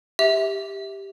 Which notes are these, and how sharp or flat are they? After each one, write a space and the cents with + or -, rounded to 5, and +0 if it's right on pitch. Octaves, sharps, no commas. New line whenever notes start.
G4 +0 E5 -20